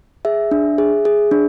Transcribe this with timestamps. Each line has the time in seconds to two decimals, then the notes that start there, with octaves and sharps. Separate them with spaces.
0.25 G#4 E5
0.51 D4
0.78 G#4
1.05 G#4
1.31 D4